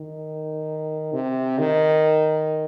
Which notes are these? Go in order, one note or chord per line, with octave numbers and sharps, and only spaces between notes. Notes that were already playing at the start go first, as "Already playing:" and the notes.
Already playing: D#3
C3
D#3